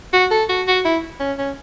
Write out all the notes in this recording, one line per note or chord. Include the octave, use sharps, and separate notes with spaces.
F#4
A4
F#4
F#4
E4
C#4
C#4